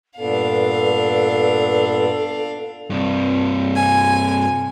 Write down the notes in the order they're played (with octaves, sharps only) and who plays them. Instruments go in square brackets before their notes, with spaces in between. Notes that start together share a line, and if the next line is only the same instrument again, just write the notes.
[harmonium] G2 A#2 B3 [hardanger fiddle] D4 F5 [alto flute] A4
[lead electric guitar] G2 C3
[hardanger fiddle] G#5